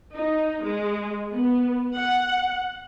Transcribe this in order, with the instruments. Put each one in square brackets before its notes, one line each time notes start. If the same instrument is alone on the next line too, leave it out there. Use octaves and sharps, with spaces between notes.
[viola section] D#4
G#3
B3
F#5